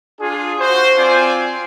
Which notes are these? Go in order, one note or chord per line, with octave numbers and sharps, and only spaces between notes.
D4 F4 G#4
F#4 C5
C4 F4 C5 D5 G#5